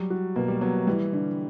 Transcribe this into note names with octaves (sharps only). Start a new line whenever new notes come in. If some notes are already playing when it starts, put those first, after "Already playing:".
Already playing: F#3 G3
F#4
B2 A#3
G3
F#3 B3
E3 G3
D3